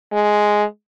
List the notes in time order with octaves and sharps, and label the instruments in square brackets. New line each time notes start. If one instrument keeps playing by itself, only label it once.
[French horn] G#3